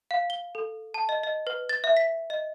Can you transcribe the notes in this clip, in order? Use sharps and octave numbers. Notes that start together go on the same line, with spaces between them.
F5
G7
A4
A5
D#5
D#5
B4
A6
E5
B6
D#5